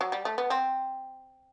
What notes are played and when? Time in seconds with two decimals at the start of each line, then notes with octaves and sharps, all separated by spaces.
0.01 F#3
0.12 G3
0.25 A3
0.38 B3
0.50 C4